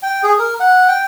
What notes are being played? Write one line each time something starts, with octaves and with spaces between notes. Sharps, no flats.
G5
G#4
A#4
F#5
G5